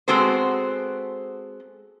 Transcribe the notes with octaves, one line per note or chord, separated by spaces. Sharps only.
G#3 B3 C4 F#4 A4 C5